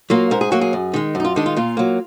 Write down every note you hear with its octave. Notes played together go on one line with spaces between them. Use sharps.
F#3 A#3 F4
G#2 A#4
G#4
F#3 A#3 F#4
G#4
F#2
D#3 G#3
F#2 D#4
F4
D#3 G#3 D4
F4
A#2 F4
F#3 A#3